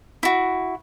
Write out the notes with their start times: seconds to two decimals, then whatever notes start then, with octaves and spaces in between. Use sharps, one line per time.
0.23 E4 F#4